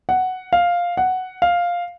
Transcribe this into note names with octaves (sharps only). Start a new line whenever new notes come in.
F#5
F5
F#5
F5